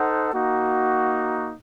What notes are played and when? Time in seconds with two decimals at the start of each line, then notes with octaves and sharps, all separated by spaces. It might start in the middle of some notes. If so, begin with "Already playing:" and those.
Already playing: D#4 A4 C5 F#5
0.33 A#3 D#4 F#4